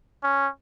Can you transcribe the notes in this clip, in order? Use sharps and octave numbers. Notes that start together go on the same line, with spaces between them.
C#4